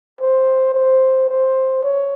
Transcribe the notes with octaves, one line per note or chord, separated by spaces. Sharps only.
C5
C5
C5
C#5